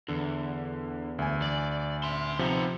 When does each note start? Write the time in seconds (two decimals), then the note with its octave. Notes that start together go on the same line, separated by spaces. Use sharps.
0.08 E2 D3
1.19 D2 G#5
1.42 D5
2.04 E5 C6
2.39 C3 F3 B3 D#4